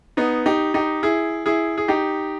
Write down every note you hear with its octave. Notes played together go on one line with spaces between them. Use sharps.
B3 D#4
D#4 G4
D#4 G4
E4 G#4
E4 G#4
G#4
D#4 G4